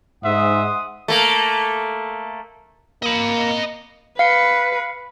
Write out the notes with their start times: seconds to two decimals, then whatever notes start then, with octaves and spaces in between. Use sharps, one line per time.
0.24 G#2 E5 F#5 C6 D#6
1.08 A3 A#3
3.03 A#3 D#5 B5
4.19 B4 F5 C#7